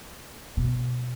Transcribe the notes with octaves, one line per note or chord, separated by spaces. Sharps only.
B2